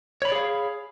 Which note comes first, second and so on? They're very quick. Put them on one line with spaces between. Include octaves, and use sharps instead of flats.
C#5 B5 D5 G#4 F5